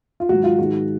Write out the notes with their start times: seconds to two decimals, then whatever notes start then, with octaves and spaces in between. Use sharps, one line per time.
0.20 F4
0.29 G#2 D#3 F#3 F#4
0.44 F4
0.59 G#2 D#3 G#3 F#4